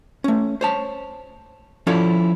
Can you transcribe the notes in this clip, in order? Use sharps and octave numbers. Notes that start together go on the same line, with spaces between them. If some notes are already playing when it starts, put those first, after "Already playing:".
A3 C#4
C5 C#5 A5
F3 C#4 E4 A4 C#5 D5